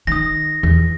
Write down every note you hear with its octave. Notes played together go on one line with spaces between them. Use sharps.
D#3 D#6 A#6
E2